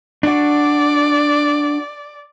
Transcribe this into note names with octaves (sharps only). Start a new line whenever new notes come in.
D4 F#4 D5